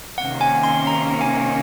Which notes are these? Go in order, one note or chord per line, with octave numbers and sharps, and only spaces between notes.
C3 D#3 A#3 C#4 F#5
G#5
C6
A#5
G#5